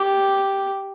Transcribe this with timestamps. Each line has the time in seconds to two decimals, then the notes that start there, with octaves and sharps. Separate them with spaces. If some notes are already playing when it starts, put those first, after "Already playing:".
Already playing: G4